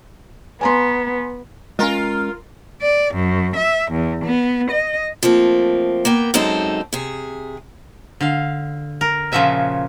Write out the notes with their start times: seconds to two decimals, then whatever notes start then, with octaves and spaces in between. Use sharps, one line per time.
0.61 B3 G#5 A#5 C6
1.79 G#3 C#4 F4 A#4
2.82 D5
3.14 F#2
3.56 E5
3.91 E2
4.24 B3
4.70 D#5
5.23 F3 A3 A#3 C4
6.05 A#3 B3 G5
6.34 F#2 G#3 C4 D#4 A4
6.93 C3 G#4
8.21 D3 F5
9.01 A#4
9.32 A#2 C#3 F3 F#4 E5 G#5